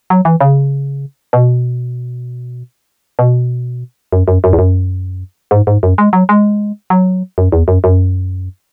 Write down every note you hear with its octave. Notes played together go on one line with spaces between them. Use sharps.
F#3
E3
C#3
B2
B2
F#2
F#2
F#2
E2
F#2
G#2
G#2
F#2
G#3
F#3
G#3
F#3
F#2
E2
F#2
F#2